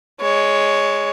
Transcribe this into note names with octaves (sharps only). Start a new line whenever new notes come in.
G#3 C#5